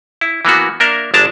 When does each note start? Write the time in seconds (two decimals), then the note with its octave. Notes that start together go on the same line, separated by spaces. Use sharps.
0.21 E4
0.45 E3 A#3 B3 F#4
0.80 A#3 D4 A#4 E5
1.14 G1 G#3 D4 A5 A#5